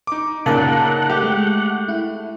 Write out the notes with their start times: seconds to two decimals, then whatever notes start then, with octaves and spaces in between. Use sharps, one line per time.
0.07 D#4 D6
0.46 A#2 C#3 D#4 A#4 F#5 A5
1.10 A3 G4
1.22 G#3
1.88 E4